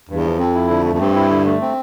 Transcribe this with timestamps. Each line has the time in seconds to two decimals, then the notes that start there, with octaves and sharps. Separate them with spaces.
0.09 E2 G2
0.24 F3
0.39 F2 C4
0.55 E4
0.69 D3
0.85 A3
0.94 F2
1.00 G2 C4
1.15 E4
1.31 D3
1.46 A3
1.61 C4